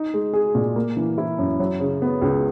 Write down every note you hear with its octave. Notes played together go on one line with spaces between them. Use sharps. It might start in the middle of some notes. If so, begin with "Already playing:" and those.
Already playing: D#4
G#3
G#4
A#2
A#3
E3
E4
F#2
F#3
C#3
B3
C#2